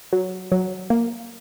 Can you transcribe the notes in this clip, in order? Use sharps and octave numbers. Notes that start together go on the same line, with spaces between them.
F#3
F#3
A#3